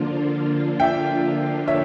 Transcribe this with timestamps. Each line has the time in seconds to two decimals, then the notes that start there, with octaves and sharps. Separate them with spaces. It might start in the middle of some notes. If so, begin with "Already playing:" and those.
Already playing: D3 F3 A#3 D4 F4
0.80 E5 G5
1.67 C#5 E5